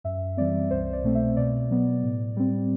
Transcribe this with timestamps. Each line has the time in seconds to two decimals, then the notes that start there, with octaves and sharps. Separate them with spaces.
0.04 F#2 E5
0.37 E3 G3 C4 D5
0.70 C2 C5
0.93 D5
1.04 B2 A3 C4
1.15 E5
1.37 B2 D5
1.70 F#3 B3
2.03 A2
2.37 G3 C4